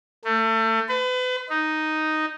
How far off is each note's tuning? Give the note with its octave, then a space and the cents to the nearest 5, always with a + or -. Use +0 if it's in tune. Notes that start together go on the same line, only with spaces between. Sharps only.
A3 +30
B4 +35
D#4 +0